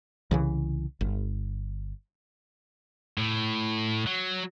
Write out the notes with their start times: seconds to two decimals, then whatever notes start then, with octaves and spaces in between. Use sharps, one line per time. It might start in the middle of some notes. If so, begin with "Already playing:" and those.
0.31 C2 C#3 E3
1.01 G1
3.18 A2
4.07 F#3